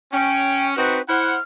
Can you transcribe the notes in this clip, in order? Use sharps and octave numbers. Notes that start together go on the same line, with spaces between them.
C#4 G5
C4 D#4 F#4 B4
E4 C5 F#5 F6